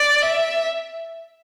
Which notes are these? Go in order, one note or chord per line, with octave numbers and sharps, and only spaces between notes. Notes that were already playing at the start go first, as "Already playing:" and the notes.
Already playing: D5
E5